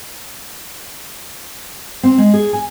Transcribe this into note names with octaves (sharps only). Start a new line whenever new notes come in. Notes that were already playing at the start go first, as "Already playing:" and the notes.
C4
G#3
G#4
G#5